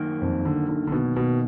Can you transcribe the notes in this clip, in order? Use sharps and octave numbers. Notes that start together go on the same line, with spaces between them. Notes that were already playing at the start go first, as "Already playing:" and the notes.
Already playing: F#2 D#3 A#3
F2
D3
D3
D3
B2
B2